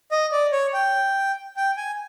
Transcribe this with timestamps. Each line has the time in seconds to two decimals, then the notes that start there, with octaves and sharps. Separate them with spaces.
0.11 D#5
0.32 D5
0.52 C#5
0.74 G5
1.57 G5
1.77 G#5